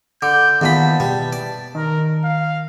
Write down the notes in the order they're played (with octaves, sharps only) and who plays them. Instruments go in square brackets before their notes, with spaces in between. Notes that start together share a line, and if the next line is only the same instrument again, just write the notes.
[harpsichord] D3 [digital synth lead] D6 [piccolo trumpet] G6
[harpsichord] E2 A#2 B5 [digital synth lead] D#3 [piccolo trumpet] A5
[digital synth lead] B2 [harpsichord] G3
[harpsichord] D5
[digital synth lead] D#3 [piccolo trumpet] A#4
[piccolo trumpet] F5